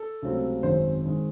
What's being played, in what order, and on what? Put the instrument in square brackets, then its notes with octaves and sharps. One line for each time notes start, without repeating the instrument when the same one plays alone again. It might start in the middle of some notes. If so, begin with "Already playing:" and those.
Already playing: [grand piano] A4
C#2 C3 F#3 A3 C4
G#1 F#2 D#3 G#3 C4 C5
D#3 G#3 C4